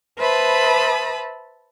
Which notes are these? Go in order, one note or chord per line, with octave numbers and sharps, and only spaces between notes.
B4 C5 E5 A5 B5 D#6